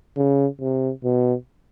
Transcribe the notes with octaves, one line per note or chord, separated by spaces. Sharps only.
C#3
C3
B2